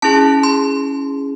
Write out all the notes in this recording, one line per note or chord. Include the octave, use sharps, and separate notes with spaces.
C#4 E4 G#4 A5
C6